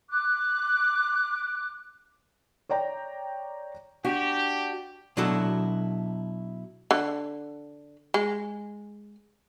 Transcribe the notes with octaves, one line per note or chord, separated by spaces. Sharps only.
D6 F#6
C#5 D5 G5 A#5
D4 F#4 G4
B2 F#3 D4 E4 F#4 A4
D3
G#3